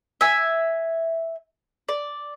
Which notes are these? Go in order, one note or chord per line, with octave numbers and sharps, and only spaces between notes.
E5 G#5
D5